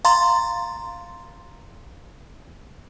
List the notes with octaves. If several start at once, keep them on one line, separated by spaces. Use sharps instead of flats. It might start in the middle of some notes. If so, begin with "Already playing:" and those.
F5 A#5 C6 A6